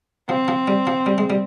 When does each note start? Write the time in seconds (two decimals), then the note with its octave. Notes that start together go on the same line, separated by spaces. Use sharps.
0.29 F3 C4
0.48 F3
0.68 G3
0.87 F3
1.06 G3
1.18 G#3
1.30 G3